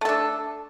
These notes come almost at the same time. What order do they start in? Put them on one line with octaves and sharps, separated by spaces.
A3 A4 D4